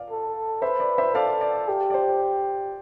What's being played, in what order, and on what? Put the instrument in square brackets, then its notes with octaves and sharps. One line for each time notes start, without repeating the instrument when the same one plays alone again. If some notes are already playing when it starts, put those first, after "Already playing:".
Already playing: [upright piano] D5 F5
[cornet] A4
[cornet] B4 [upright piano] C5 E5
[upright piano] D5
C5 E5
[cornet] A4 [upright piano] D5 F5
[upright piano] D5
[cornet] G4
[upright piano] D5
C5